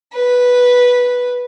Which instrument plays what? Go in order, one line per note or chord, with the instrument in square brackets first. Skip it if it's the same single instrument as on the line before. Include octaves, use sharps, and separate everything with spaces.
[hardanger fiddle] B4